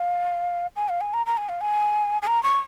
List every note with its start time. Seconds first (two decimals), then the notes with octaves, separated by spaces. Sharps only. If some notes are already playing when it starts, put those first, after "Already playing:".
Already playing: F5
0.76 G#5
0.89 F5
1.01 G#5
1.13 A#5
1.26 A#5
1.37 G#5
1.49 F5
1.61 G#5
2.22 G#5
2.27 A#5
2.43 C#6